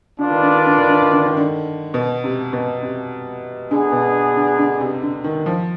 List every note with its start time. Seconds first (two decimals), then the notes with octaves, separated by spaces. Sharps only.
0.18 D3 D4 F4 B4 D5
0.30 D#3
0.43 D3
0.54 D#3
0.66 D3
0.78 D#3
0.90 D3
1.02 D#3
1.13 D3
1.26 D#3
1.37 D3
1.94 B2
2.24 C3
2.53 B2
2.82 C3
3.70 D3 B3 D4 G#4
3.92 B2
4.36 D3
4.58 D3
4.80 C3
5.02 D3
5.24 D#3
5.46 F3